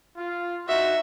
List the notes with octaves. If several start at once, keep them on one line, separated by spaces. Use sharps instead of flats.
F4
D#4 F#4 E5